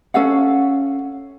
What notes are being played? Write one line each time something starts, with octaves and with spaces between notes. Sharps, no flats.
C#4 A4 F5 F#5